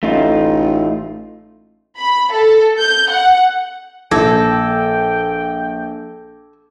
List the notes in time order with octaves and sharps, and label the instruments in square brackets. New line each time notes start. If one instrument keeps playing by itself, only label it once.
[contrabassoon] A1 [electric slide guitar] A3 D#4 F4
[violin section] B5
A4
G6
F#5
[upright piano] A#1 [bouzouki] A4 [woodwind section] G5 [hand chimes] D6 G#6 A#6